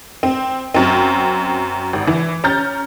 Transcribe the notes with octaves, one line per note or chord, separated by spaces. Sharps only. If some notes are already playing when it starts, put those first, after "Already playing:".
C4
F#2 C4
G#1
E3
C#4 A#5 F6 G6 A6